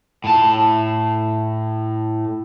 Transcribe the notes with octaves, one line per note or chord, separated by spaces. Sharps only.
A2 A5